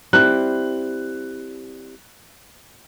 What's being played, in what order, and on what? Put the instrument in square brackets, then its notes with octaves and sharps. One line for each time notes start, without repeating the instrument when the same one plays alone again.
[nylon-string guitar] G3 C4 E4 [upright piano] F#6